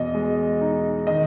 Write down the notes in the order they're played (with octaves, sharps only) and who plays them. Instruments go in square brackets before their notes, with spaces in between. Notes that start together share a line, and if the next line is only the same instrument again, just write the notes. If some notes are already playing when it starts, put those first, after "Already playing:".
Already playing: [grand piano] E2 B2 [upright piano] D#5
[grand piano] G#3
D#4
[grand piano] D#3 [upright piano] D#5